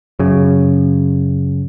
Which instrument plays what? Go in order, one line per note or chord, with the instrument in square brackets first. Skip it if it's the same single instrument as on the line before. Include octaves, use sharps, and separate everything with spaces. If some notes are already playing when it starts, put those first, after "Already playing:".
[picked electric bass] F#2 C#3